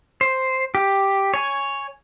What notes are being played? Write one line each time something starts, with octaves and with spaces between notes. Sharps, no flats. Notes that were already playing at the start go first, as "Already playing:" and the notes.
C5
G4
C#5 G#5